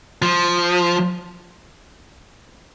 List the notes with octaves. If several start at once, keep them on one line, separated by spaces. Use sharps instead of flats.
F3